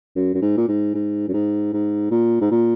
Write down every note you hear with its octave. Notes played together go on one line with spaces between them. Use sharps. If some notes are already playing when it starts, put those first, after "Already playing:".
F#2
F#2
G#2
A#2
G#2
G#2
F#2
G#2
G#2
A#2
G#2
A#2